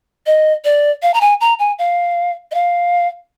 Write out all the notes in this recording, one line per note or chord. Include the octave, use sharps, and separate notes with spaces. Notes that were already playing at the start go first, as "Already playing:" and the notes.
D#5
D5
F5
A#5
G#5
A#5
G#5
F5
D#5
F5